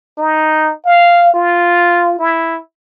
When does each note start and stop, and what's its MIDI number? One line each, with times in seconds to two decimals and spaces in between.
0.18 0.72 63
0.86 1.32 77
1.34 2.14 65
2.19 2.58 64